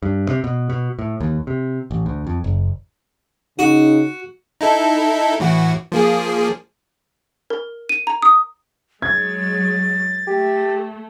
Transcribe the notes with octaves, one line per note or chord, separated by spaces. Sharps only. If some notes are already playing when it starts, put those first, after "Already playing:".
G2
C3
B2
B2
A2
D#2
C3
A1
D2
F2
F#1
C#3 D#4 F#4
D#4 E4 A4
A2 E3 F#4
F3 A#3 G#4
A#4
D#7
A#5
D#6
F#3 G#3 G#6 A6
A3 G4